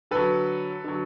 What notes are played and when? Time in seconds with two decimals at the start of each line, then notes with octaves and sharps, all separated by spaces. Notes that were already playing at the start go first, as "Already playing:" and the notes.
0.11 D3 F#3 A4 B4
0.84 D3 F#3